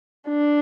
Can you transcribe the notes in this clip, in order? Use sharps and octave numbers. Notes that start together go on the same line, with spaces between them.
D4